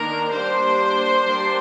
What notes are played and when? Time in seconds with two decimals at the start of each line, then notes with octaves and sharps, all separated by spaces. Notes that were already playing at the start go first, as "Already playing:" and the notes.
Already playing: D#3 A#3 D4 A#4 A#5
0.31 G3 A#3 D4 C5 C6
1.26 G3 A#3 D4